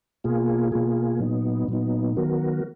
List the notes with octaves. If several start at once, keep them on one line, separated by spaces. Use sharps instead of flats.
B2 A#3 F4 G#4
B2 A#3 F4 G#4
A#2 F#3 B3 D#4
A#2 F#3 B3 D#4
D#3 F#3 B3 F#4 A#4